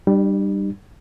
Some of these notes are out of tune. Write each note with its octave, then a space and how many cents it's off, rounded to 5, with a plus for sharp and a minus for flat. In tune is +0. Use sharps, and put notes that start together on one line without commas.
G3 +0 D4 +40